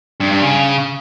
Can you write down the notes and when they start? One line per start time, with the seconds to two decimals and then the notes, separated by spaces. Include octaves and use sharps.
0.20 G2
0.31 G2
0.42 C#3